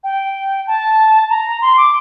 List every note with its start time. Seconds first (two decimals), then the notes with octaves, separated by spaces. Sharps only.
0.04 G5
0.67 A5
1.30 A#5
1.62 C6
1.77 D6